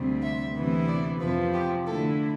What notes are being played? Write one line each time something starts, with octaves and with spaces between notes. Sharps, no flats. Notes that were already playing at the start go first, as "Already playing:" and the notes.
Already playing: D2 C3 G3 C4
E5
D2 C3 E3 B3 E4
D5
F2 C3 F3 B4
G4
D3 A3 E4 A4